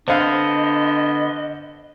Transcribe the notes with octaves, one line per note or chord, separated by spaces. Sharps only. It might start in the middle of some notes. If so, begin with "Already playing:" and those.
D3 B3 C4 D4 D#5 F5